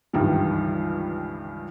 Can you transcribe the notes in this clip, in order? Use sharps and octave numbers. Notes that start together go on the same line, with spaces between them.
C#2 G2 D#3 E3 G3